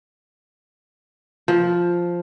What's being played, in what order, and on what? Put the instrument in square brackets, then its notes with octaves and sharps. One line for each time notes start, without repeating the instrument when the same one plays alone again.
[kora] F3